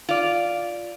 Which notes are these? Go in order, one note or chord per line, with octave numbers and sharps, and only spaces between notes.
F4 D5